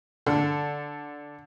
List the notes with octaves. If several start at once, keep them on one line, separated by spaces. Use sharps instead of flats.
D3